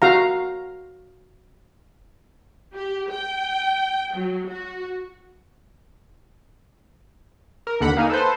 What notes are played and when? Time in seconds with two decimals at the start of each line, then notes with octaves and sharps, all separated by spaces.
0.02 F#4 F5 A#5
2.74 G4
3.10 G5
4.14 F#3
4.48 F#4
7.67 A#4
7.80 D#2 D3 F#5 B5
7.97 A#3 D#4 A#4 G#5
8.10 A4 B4 C5